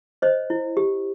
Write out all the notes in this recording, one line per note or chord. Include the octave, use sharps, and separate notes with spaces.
C5 C#5 D#5
E4
G4